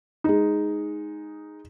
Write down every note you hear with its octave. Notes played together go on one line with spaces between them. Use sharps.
G#3 D#4